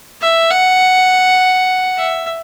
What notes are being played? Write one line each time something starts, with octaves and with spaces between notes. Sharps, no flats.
E5
F#5
E5